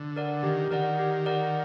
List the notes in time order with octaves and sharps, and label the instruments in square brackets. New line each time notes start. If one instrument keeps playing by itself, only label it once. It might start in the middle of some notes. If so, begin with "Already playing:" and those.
Already playing: [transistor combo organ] D3
[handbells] A#4 D5 F#5
[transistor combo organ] D#3 [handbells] G4
[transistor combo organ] D#3 [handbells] A#4 D5 F#5
[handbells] G4
A#4 D5 F#5